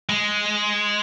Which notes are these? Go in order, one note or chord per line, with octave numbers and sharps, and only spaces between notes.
G#3